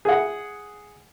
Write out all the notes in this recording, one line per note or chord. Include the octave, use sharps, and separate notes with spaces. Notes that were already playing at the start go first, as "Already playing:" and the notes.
G#4 F#5